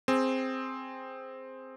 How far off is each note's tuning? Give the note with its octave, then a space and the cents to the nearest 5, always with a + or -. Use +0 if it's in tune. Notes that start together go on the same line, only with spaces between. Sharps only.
C4 +0 G#4 +0